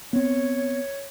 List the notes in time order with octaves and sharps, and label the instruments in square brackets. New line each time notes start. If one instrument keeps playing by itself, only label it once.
[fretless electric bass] B3 C4 [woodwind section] C#5